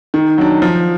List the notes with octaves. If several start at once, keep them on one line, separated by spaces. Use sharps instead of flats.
D#3
F#3 D4
F3